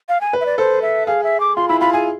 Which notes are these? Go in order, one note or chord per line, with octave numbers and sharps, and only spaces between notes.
F5
G#5
B4
E5
D5
A4 C5
E5
G#4 F5
E5
D6
F4 C6
E4 B5
F4 B5
G#4 G#5